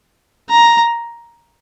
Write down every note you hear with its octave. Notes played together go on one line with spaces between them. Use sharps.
A#5